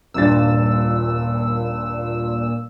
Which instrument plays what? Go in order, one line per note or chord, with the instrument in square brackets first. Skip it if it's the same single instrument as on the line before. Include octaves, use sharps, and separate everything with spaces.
[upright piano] D#1 G2 A6 [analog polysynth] A#2 E6